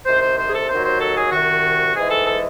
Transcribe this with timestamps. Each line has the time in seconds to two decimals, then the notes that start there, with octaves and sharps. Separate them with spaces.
0.06 C2 C3 D#3 C5
0.22 C5
0.37 C5
0.49 G#4
0.54 A4
0.69 D#2 D#3 F#3 C5
0.85 C5
1.01 A4
1.17 G#4
1.32 C2 C3 D#3 F#4
1.95 G#2 E3 G#3 G#4
2.11 A4
2.26 A4